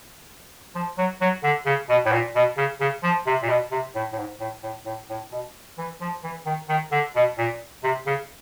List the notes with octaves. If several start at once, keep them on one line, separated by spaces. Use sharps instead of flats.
F3
F#3
F#3
D3
C#3
B2
A2
A#2
B2
C#3
C#3
F3
C3
A#2
B2
C3
A2
A2
G#2
A2
A2
A2
A2
B2
E3
F3
E3
D#3
D#3
D3
B2
A#2
C3
C#3